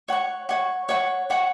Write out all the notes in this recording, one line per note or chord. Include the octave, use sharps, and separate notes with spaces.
C#5 F#5 C#6
C#5 F#5 C#6
C#5 F#5 C#6
C#5 F#5 C#6